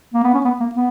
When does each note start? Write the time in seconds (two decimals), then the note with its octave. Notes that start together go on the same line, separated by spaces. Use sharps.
0.14 A#3
0.24 B3
0.34 C#4
0.45 B3
0.60 A#3
0.75 B3